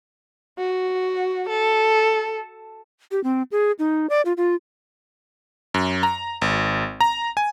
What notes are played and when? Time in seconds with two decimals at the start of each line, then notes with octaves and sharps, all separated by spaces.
0.59 F#4
1.50 A4
3.12 G4
3.24 C4
3.52 G#4
3.79 D#4
4.10 D5
4.25 F4
4.37 F4
5.74 F#2
6.03 A#5
6.42 G#1
7.01 A#5
7.37 G#5